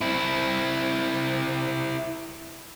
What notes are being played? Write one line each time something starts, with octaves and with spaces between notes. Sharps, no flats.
C4 E4